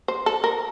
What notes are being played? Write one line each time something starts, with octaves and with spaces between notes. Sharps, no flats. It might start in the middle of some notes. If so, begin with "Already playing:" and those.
C5
A4
A#4